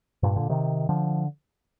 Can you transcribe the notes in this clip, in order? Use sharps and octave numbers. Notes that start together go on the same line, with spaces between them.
G2 A#2
A#2 D3
C3 D#3
D3 F3